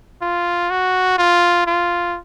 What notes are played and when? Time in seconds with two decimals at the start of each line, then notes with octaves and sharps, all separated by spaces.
0.22 F4
0.70 F#4
1.18 F4
1.67 F4